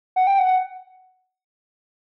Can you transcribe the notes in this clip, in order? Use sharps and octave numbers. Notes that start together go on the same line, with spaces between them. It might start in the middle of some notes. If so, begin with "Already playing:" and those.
F#5
G5
F#5